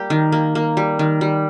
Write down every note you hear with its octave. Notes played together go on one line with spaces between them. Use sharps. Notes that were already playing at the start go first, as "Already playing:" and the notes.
Already playing: G3 A#3 G4
D#3
A#3
A#3
G3
D#3
G3